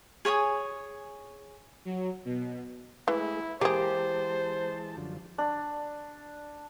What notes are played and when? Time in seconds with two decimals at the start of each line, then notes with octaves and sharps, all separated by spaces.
0.25 G#4 C#5 G#5 D#6
1.85 F#3
2.25 B2
3.08 E3 G#3 A3 E4 G#4
3.61 E3 G#3 A#3 G4 G#4 C5 A5
4.97 F#2 D3 F3
5.38 D4